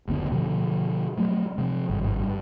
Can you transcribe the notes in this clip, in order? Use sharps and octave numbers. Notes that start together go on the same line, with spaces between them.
F#1 D2 B3 D4
B2 D3 F3
F#3 G#3 A3
C3 F3
G#1 G2
G2